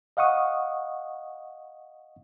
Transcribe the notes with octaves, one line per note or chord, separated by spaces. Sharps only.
D#5 F5 F#5 C#6 D#6